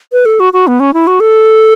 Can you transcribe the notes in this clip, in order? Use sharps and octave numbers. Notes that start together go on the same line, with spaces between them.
B4
A4
F#4
F#4
B3
C#4
E4
F#4
A4